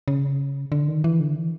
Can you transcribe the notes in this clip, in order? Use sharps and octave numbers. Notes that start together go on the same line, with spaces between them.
C#3
D3
D#3
E3
D3
E3